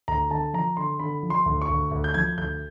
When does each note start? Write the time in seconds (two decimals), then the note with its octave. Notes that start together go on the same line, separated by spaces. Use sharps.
0.08 D2 A#5
0.31 D3 A5
0.54 F3 A#5
0.77 D3 C6
0.99 D3 B5
1.23 F3
1.30 C6
1.46 D2
1.61 C#6
1.69 D2
1.91 D2
2.04 G6
2.14 F3 G#6
2.37 D2 G6